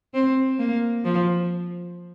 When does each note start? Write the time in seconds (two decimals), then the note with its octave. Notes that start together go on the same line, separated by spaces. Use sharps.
0.14 C4
0.59 A#3
1.04 F3